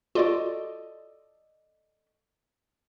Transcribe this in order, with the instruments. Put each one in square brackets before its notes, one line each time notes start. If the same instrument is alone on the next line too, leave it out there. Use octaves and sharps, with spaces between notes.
[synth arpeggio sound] F4 F#4 [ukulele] A4 D5 D#5